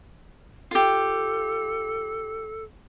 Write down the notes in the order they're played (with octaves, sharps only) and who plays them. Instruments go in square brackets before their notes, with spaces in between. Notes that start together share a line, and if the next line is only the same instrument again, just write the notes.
[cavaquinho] F4 G4 [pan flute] A4